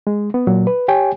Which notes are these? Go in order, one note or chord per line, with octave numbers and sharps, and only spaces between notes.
G#3
B3
A#2 F#3
B4
G4 C#5 G5 G#5